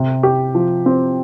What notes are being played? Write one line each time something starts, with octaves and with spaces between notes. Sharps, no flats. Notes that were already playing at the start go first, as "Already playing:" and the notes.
Already playing: C3
G4
F3
C4